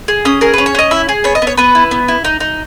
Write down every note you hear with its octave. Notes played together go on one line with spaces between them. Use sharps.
G#4
C#4 D#6
G#4 A#4
C#4 B4
C#5
C#4 D#5
E4 E5
G#4
B3 C#5
D#5
B3
C#5
B3 B4
E4
B3
E4
D#4
D#4